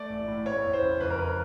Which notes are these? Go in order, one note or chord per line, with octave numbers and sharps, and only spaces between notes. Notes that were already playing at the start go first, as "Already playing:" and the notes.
Already playing: A3 D5
A1
A2
A3 C#5
E2
C5
C#3
F2 B4
A#4
B4